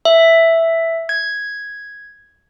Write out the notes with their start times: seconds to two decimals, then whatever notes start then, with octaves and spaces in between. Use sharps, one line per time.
0.05 E5
1.09 G#6